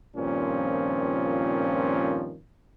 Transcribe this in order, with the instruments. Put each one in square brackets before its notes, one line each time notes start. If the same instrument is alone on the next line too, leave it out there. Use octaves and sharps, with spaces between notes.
[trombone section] G2 A#2 D#3 F3 C4 C#4